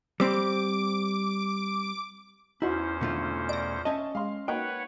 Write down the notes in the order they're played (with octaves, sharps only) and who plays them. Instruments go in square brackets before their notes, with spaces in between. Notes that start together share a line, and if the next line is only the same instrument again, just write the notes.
[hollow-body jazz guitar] G3 C4 C5 [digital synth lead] D6
[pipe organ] E2 C#4 C5 [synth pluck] D#4 F#4 [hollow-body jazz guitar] E4
[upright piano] G#1 D3 [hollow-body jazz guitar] B2 A3 F4
[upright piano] D5 [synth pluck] A#6 D7
[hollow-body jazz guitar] C#4 D#5 [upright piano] E5 A5
[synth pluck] G#3 [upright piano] F5 C6
[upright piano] A#3 [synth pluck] D#4 F#4 [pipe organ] B4 C#5 F#5 [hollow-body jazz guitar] G5